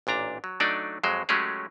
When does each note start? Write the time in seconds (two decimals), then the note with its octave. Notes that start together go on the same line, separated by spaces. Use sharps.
0.07 A1 A#2 D4 A#5
0.44 F#3
0.60 F#3 A3 D4 D#4 D5
1.03 F2 F#3 G#3 C5
1.29 F#3 G#3 A3 C#4 G4 G#4